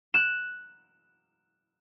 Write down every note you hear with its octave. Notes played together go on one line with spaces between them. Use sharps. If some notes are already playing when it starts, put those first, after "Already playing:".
F#6 E7